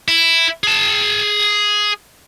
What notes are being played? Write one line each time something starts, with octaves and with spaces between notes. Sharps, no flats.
E4
G#4 A5